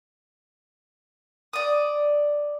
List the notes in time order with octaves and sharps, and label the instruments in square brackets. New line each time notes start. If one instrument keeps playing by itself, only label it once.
[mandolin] D5 D#6